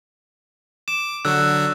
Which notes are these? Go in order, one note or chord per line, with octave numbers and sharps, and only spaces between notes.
D6 E7
D3 F#3 F#4 E6 F#6